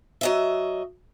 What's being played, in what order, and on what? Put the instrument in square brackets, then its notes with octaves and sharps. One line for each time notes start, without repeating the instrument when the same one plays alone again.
[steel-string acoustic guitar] F#3 D#5 E5